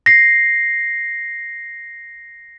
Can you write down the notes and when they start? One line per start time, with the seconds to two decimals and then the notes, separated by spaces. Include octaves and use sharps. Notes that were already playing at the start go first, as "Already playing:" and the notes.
0.06 A#6 C7